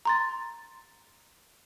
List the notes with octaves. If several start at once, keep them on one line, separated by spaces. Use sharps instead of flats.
A#5 C6 A6